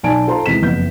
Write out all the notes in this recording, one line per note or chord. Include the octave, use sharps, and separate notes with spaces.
B1 D5 G#5 A5 D7
F4 A4 C5 A5 A#5 C6
E2 C3 G#3 B6 E7
F#1 F2 B3 G6